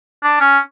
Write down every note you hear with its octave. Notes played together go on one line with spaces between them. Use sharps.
D4
C#4